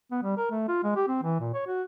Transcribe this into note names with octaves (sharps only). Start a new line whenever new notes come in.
B3
G3
A#4
A3
F4
G#3
G4
C4
E3
A#2
C#5
F#4